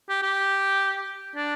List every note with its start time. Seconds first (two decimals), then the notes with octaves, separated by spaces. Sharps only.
0.09 G4
0.23 G4
1.36 D4